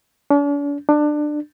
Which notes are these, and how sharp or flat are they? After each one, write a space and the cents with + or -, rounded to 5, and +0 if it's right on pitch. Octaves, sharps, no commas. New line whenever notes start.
D4 -45
D4 +20